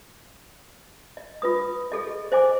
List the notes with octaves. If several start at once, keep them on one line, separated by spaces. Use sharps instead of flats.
D#5
F4 B4 D#6
G#4 A4 D#5
C5 D#5 G#5 D6